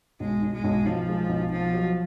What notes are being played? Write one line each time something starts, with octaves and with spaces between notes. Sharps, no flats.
B1 G#3
B1
G#3
B1
B1 F3
G#3
B1
B2 F3
F#3